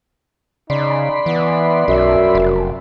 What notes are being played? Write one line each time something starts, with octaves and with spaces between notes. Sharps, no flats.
C#3 D#4 D5 B5 C6
E3 B3
B1 F#2 E5
F1